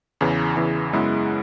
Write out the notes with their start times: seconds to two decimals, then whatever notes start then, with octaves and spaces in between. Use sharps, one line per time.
0.21 E2 C#3 E3
0.57 E2 C#3 E3
0.93 F#2 C#3 G#3 B3 E4